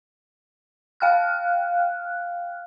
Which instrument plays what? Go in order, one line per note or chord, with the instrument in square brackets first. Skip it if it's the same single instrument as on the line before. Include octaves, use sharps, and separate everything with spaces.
[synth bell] F5 G5 F6 F#6